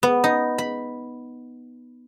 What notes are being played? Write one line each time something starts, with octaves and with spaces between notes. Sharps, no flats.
B3
D#4
B5